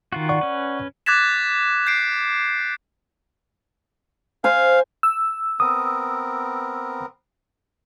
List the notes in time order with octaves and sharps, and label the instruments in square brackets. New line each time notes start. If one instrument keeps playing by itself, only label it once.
[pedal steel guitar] D#3 F4 F#4
[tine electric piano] D5 F#5 C#6
[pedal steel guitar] C#4 B4
[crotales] D6 F#6 G#6 A6 B6 E7
G6 C7 D7
[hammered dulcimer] C5 G#5 [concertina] F5
[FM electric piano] E6
[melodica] B3 C4 A#4 [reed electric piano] D#6